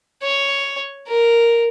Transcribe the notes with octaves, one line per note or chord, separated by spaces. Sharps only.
C#5
A#4